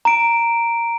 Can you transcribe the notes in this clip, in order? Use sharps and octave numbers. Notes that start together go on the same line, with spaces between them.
A#5 D7